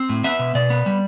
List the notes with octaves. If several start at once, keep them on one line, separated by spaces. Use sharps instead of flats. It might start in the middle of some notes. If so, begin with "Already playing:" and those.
Already playing: C4
A2
B3 E5
B2
B2 D5
B3
G3